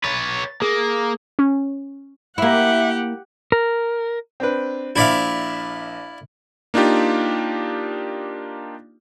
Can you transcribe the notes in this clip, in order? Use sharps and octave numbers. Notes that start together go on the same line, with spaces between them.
B4 C#5 A6
A#3 G#4
C#4
A#3 E4 G4 E5 F#5
A#4
C4 D4 B4
A#1 E4 C5 D5 E5 F5
A#3 D4 D#4 F4 G4